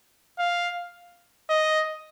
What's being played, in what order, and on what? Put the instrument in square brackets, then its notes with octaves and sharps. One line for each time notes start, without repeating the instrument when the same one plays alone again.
[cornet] F5
D#5